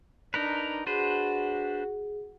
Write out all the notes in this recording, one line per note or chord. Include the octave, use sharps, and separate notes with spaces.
D4 D#4 A#4 B4
D4 F#4 G#4 B4 C5